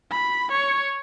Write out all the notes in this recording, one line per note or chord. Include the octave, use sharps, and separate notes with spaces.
B5
C#5